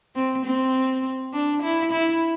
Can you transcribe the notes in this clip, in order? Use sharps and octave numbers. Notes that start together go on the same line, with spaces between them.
C4
C4
D4
E4
E4